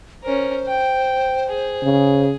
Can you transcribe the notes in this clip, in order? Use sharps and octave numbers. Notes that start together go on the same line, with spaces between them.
C#4 A#4 C5
G5
G#4
C#3